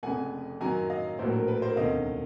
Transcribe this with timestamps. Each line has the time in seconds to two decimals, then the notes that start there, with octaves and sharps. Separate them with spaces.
0.03 F1 F2 C#3 F#5 G#5
0.61 F#2 D#3 F#3 G#5 A#5
0.90 D#5 F5
1.19 A#1 A2 F#3 A3 A#4 C5
1.33 A#4
1.48 B4
1.62 A#4 C5
1.76 E1 D2 C3 D#3 D#5 F5